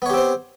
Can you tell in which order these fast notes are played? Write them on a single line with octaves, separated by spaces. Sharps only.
B3 C#5 G4 C4 C5